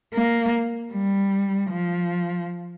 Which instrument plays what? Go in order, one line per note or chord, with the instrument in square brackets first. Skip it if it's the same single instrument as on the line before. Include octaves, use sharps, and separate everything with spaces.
[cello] A#3
G3
F3